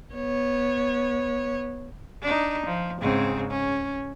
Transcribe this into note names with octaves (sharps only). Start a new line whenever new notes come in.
B3 C#5
D4 D#4
F3
G#2 C#3 C4
C#4